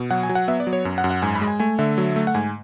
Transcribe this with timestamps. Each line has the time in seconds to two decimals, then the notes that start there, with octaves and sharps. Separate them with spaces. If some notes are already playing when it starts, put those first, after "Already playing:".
Already playing: B2
0.11 F#3 F#5
0.23 G#5
0.29 F#3
0.35 F#5
0.48 B3 E5
0.60 D5
0.67 F#3
0.73 C#5
0.85 F#2
0.98 F#5
1.04 F#2
1.10 F#5
1.22 G#2 G#5
1.35 B5
1.42 G#3
1.48 G#5
1.60 A3 G#5
1.79 D3 E5
1.98 F#3
2.16 A3
2.27 F#5
2.35 G#2 G#5